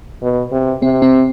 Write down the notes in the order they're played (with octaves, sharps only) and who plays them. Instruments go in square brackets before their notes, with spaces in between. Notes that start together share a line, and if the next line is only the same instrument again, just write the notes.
[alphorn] B2
C3
[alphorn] C3 [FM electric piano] C4
[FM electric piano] C4